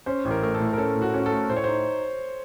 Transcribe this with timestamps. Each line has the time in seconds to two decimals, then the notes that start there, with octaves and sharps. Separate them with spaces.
0.06 C#4 C5
0.25 A1
0.31 A#4
0.42 A3 A#4
0.54 A4
0.60 A2
0.73 A#4
0.77 C#4 A4
0.95 A2
1.02 F#4
1.14 C#4 F#4
1.26 A4
1.31 A3
1.49 A2 C5
1.57 C#5
1.64 D#4 C5